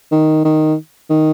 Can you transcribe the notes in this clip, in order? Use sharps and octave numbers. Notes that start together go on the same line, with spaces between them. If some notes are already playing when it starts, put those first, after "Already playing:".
D#3
D#3
D#3